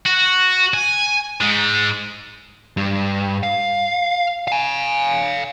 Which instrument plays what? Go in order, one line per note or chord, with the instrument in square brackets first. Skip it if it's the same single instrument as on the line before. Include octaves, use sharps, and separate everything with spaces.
[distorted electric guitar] F#4
G#5
G#2 G#3
[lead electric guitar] G2
F5
F5 G#5